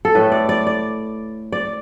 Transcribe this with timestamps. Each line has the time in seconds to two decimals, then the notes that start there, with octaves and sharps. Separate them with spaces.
0.05 A4
0.15 A2 A3 B4
0.32 D5
0.49 D5
0.67 D5
1.52 D5